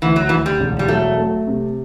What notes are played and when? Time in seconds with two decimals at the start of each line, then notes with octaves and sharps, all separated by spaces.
0.02 D2 E3
0.16 F#3
0.29 D2 E3
0.46 G3
0.60 E1
0.79 G3
0.88 F#3 A3
1.17 A3
1.47 C3